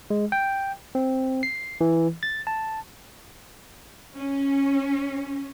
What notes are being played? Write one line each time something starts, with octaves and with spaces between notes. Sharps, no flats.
G#3
G5
C4
C7
E3
A6
A5
C#4